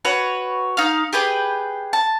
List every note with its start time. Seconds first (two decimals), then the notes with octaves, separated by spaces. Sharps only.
0.05 F#4 B4 C#5
0.77 D#4 F5
1.13 G4 G#4 B4 G5
1.93 A5